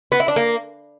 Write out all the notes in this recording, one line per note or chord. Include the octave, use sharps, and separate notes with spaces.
B3
E4
D4
A#3